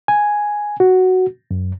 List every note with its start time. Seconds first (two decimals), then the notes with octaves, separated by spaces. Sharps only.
0.08 G#5
0.80 F#4
1.51 F#2